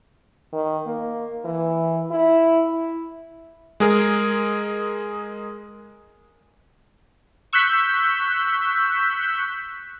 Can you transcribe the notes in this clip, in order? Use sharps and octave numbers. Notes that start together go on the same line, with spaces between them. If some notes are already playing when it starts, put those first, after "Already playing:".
D#3
A#3
E3
E4
G#3 G#4 A#4
C#6 E6 F#6 G6 B6